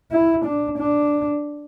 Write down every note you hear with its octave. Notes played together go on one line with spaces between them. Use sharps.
E4
D4
D4